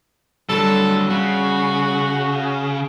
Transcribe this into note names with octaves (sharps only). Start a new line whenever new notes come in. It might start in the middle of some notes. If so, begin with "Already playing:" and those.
D3 F#3 G3 A4
C#3 F#4